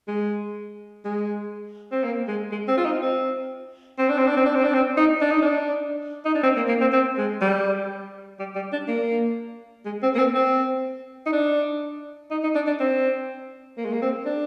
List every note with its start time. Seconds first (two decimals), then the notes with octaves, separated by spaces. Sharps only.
0.08 G#3
1.05 G#3
1.92 C4
2.03 A#3
2.28 G#3
2.52 G#3
2.68 C4
2.77 F4
2.85 D#4
3.01 C4
3.98 C4
4.09 D4
4.18 C4
4.27 D4
4.36 C4
4.46 D4
4.54 C4
4.64 D4
4.73 C4
4.97 D#4
5.21 D4
5.31 D#4
5.42 D4
6.25 D#4
6.34 D4
6.43 C4
6.56 A#3
6.68 A#3
6.81 C4
6.92 C4
7.17 G#3
7.41 G3
8.39 G3
8.55 G3
8.72 D4
8.88 A#3
9.85 G#3
10.02 C4
10.15 A#3
10.18 C4
10.35 C4
11.26 D#4
11.32 D4
12.31 D#4
12.43 D#4
12.55 D4
12.67 D4
12.80 C4
13.77 A#3
13.85 G#3
13.93 A#3
14.02 C4
14.26 D4